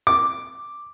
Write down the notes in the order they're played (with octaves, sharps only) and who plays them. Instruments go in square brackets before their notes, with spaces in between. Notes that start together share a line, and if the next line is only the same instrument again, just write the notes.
[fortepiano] D6